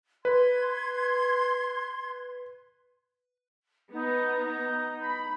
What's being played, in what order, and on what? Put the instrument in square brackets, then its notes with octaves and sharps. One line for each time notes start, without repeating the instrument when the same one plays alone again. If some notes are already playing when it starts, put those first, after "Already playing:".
[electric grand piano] B4 [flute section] C6 G#6
[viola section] B3 A#5 [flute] D#4
[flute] D#4
[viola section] B5